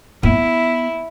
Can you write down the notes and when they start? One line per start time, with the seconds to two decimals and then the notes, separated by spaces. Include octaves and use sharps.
0.23 B3 E4